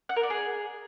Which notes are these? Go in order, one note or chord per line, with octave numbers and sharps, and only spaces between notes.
F#5
A#4
D5
G#4